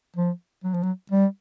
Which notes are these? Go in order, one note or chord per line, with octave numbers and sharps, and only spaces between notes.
F3
F#3
F3
F#3
G3